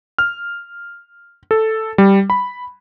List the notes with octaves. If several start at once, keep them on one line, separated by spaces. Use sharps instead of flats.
F6
A4
G3
B5